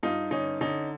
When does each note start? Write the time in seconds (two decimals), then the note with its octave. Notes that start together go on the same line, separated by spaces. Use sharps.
0.03 G2 D#4 F4
0.31 D3 C#4 D#4
0.61 D3 C#4 D#4